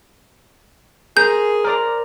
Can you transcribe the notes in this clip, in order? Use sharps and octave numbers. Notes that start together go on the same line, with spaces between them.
G#4 A#4 C5 A#5 G6
A#4 C5 D5 A#5